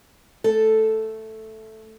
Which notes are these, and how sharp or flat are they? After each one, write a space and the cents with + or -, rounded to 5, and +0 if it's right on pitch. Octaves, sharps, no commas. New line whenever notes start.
A3 +0 A4 +0